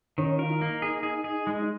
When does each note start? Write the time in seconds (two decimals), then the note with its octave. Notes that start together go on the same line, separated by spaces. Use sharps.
0.18 D#3 C#4
0.38 F4 A#4
0.50 D#4
0.61 A#3
0.82 G#4
1.03 G#4
1.24 G#4
1.47 G#3